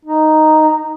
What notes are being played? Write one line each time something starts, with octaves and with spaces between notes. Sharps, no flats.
D#4